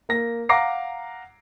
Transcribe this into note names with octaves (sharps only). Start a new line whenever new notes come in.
A#3 A#6
F5 F#5 A#5 D6 A#6 C7